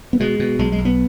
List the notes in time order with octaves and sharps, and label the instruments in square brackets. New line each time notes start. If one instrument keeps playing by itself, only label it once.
[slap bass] B3
B2 G#3
B2
B1 G#3
G#3
B1
B3